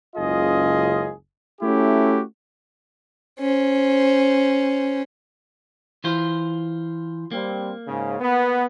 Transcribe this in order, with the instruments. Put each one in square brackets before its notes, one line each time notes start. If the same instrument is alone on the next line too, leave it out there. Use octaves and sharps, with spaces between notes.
[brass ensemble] F#1 C#2 F4 G#4 D#5
A3 C#4 E4 F#4 G4
[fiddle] C#4 C5
[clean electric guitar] E3 F4 C5
[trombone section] G3 C4 [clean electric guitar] A#3
[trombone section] G#2 C#3
B3